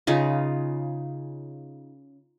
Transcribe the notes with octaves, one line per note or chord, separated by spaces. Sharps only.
C#3 D#4 F4